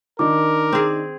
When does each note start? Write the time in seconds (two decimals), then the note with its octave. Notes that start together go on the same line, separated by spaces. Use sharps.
0.19 D#3 D4 D#4 A#4 D6
0.73 C4 G#4